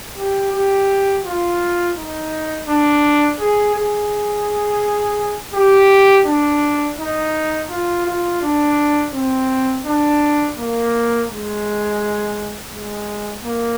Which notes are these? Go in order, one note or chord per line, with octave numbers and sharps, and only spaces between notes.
G4
G4
F4
D#4
D4
G#4
G#4
G4
D4
D#4
F4
F4
D4
C4
D4
A#3
G#3
G#3
A#3